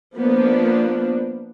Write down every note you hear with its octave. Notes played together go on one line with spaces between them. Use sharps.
F3 A#3 B3 D4